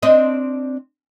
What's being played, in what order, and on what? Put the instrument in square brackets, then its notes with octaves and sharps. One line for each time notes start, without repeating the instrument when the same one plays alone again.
[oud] C4 D4 D#5